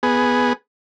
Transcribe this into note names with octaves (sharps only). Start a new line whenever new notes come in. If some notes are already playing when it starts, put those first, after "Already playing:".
B3 G#4